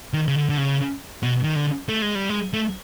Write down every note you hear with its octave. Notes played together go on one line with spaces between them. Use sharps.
D#3
C#3
D3
D3
C#3
B2
D#3
D3
A3
G#3
G3
G#3
A3